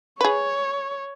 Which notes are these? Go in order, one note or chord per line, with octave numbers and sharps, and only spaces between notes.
G#4 B4 C#5